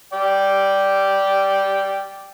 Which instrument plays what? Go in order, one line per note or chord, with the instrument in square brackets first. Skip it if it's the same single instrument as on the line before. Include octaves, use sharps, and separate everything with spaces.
[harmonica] D5 G5